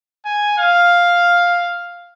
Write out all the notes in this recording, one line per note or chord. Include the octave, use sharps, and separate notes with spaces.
G#5
F5